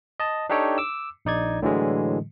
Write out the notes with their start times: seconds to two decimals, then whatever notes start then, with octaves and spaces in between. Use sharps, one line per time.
0.20 D#5 A5
0.50 D4 D#4 G4 A4 C#5 G5
0.78 D6 E6
1.25 A#1 D#4 D5 G#6
1.62 A2 D3 E3 F#3 G#3